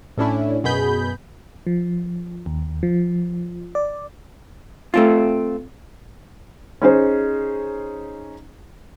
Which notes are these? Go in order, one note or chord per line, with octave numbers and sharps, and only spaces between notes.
A2 A3 C#4 D4 E4
F#2 B2 G#4 B5 G6
F3
D#2
F3
D5
A3 C4 F4
C#4 D#4 G#4 C5